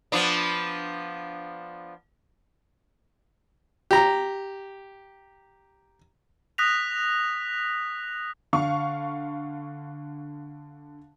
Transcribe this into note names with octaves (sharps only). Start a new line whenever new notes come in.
F3 B3 D4
G4 A#5
D#6 F#6 A#6 B6 F7
D3 F5 C#6